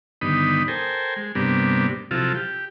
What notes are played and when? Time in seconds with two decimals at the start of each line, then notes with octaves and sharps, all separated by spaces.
0.21 G2 D3 D#3 B3 D#4 B5
0.68 A4 A#4 C5 G5 G#5
1.16 G#3
1.35 G2 C3 G3 A#3 B3 D4
2.11 C3 F3 F#3 E4 F4 A4
2.35 G4